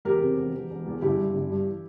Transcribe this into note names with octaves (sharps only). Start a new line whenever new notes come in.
E2 G4 A#4
C3
E1
E1
E1
E2
G1 E4 G4
G2
G1
G2
E3